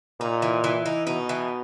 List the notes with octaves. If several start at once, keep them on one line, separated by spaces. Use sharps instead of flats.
A#2 D#4
E3
E3
D#4
B2 D#4
E3